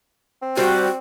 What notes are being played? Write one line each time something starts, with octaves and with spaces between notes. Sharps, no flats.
C4
G3 F#4 G4 C5